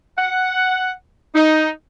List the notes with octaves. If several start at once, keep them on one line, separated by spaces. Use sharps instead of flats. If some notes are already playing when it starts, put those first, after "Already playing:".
F#5
D#4